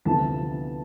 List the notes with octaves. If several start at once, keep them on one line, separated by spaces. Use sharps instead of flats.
D2 C3 F3 B3 E4 A5